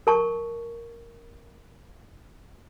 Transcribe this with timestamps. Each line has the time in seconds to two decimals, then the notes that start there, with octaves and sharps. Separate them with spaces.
0.07 A#4 A5 C#6